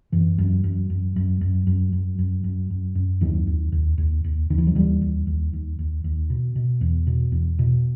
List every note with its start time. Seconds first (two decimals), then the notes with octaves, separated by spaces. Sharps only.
0.12 F#2 E3
0.38 F#2
0.64 F#2
0.90 F#2
1.16 F#2
1.41 F#2
1.67 F#2
1.93 F#2
2.19 F#2
2.44 F#2
2.70 F#2
2.95 F#2
3.21 D#2 D#3 F#3
3.47 D#2
3.72 D#2
3.98 D#2
4.24 D#2
4.50 D#2 D#3
4.58 E3
4.67 F#3
4.75 D#2 E3 G3
5.01 D#2
5.27 D#2
5.53 D#2
5.79 D#2
6.04 D#2
6.30 B2
6.56 B2
6.81 E2
7.07 B2
7.32 E2
7.59 B2